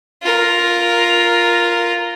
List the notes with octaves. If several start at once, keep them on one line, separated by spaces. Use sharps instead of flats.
F4 A#4